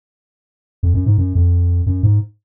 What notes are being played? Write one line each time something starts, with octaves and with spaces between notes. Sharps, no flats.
F2
F#2
G#2
F#2
F2
F#2
G#2